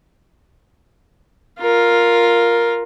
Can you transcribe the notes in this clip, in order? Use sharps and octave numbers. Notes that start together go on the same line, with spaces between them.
F4 A#4